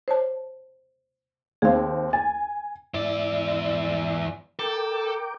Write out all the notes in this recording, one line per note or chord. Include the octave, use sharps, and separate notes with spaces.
C5 C#5 A5
D#2 C4 G#4 F5
G#5 A6
E2 G#2 E4 D5 E5
A4 A#4 G5 D6